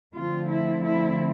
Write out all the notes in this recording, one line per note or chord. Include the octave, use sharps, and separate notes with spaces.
D3 F3 A3 C4 F4
E4
E4